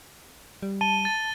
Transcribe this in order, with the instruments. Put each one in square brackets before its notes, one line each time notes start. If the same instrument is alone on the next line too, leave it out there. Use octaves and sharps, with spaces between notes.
[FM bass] G3
[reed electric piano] A5 [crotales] D#7 G7
[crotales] A6